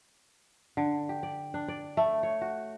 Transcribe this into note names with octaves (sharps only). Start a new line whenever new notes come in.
D3
G4
D5
D4
D5
A3
C#5
F#4